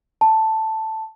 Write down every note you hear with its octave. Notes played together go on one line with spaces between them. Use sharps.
A5